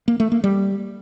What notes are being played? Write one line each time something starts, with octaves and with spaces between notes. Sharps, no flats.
A#3
A3
A#3
G3